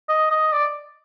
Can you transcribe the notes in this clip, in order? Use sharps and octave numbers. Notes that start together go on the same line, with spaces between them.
D#5
D#5
D5